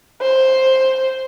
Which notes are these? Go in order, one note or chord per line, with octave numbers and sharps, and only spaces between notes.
C5